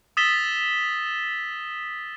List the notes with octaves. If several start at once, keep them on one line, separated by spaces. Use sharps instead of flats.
D#6 E6 A6 B6 E7 G7